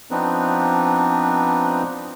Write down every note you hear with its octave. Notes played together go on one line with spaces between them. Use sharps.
F3 B3 C4 D4 D#4 B4